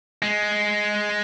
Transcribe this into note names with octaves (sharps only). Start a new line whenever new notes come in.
G#3